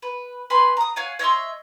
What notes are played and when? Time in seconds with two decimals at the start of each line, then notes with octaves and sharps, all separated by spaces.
0.02 B4
0.50 B4 G#5 B5 C6
0.77 A#5 D#6
0.96 C#5 F5 F#5 G#5
1.19 C#5 D#5 E5 C6